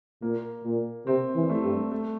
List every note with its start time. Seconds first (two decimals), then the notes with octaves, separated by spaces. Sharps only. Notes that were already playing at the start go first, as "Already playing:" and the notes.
0.22 A#2 A#3
0.65 A#2
1.06 C3 C4
1.35 E3
1.43 G3
1.49 A3
1.63 G2
1.92 A3